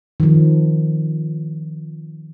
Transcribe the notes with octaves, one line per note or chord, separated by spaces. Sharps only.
D#3 F3